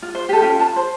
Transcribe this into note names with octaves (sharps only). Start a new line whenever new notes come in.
F4
C5
G4 A4
C#4 F4 G5
F4 A5
C5